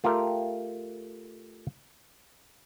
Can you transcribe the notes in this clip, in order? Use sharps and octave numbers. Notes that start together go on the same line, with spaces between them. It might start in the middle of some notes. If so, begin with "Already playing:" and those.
A3 F4 G4 A#4 F5 G5